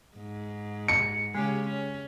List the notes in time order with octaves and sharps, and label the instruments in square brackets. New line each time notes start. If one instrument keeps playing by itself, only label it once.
[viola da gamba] G#2
[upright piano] C#7
[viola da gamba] C#3 C#4 G4 [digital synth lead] G#3
[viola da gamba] C#4